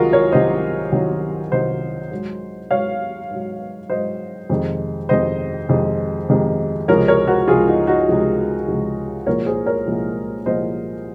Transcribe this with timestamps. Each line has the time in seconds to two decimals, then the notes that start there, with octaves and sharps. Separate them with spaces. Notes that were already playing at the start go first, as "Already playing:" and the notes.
Already playing: C2 C3 D#3 F#3 F4 F#4 G#4 A#4
0.13 A#4 C#5
0.32 C2 C3 D#3 F#3 C5 D#5
0.92 C2 C3 D#3 F#3
1.52 C2 C3 D#3 F#3 C5 D#5
2.12 G#2 F#3
2.71 G#2 F#3 C#5 F5
3.30 G#2 F#3
3.90 G#2 F#3 C5 D#5
4.49 F2 C3 D#3 G#3
5.09 F2 C3 D#3 G#3 C5 D#5
5.69 F2 C3 D#3 G#3
6.29 F2 C3 D#3 G#3
6.88 C#2 C3 F3 G#3 A#4 C#5
7.08 A#4 C#5
7.28 F#4 A#4
7.48 C#2 C3 F3 G#3 F4 G#4
7.68 D#4 F#4
7.87 D#4 F#4
8.07 C#2 C3 F3 G#3
8.67 C#2 C3 F3 G#3
9.27 C2 A#2 F3 G#3 A#4 C#5
9.46 G#4 C5
9.66 A#4 C#5
9.86 C2 A#2 F3 G#3
10.46 C2 A#2 F3 G#3 C5 D#5